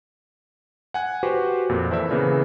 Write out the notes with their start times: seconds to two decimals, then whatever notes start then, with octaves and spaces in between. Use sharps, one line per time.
0.94 F#5 G#5 F#6
1.23 F#4 G4 B4 C5
1.70 F2 A#2
1.90 E3 E4 A4 C5 D5 E5
2.11 C#3 E3 A#3 B3